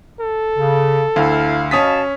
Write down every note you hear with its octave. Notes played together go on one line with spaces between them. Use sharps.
A4
C#3
D2 E4 F5
B2 C#4 F5 A5 D#6 B6